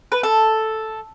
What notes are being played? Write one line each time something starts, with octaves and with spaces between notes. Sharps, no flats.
B4
A4